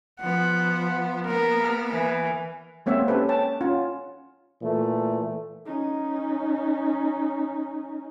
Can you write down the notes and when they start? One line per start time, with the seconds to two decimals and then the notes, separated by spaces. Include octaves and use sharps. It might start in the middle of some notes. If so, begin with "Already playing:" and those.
0.20 F3 B3 F#5
1.26 A#3 B3 A#4
1.91 E3
2.86 G#3 A#3 C4 C#5 E5 F#5
3.08 C#4 G4 A4 B4
3.29 C#5 G5 A5
3.61 C#4 F4 F#5
4.62 A#2 E3 A3
5.66 C#4 D#4